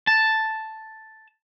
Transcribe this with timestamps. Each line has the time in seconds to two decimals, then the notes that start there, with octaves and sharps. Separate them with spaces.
0.07 A5